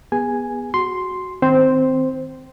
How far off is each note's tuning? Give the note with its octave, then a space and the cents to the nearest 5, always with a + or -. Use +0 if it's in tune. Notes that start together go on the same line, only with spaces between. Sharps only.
B3 -15 G#4 -30 G#5 +0
F#4 +0 C6 +0
D#3 +10 C4 -15 C5 +0